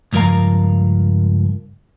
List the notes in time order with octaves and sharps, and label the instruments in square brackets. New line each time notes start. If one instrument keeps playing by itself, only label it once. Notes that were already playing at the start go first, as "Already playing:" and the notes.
[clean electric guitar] C#2 G2 F3 A#4 F5 A#5